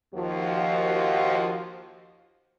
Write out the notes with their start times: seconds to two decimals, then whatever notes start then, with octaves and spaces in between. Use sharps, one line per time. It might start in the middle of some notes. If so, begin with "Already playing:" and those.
0.14 D#2 F3 F#4